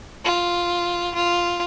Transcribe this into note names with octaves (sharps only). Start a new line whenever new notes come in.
F4
F4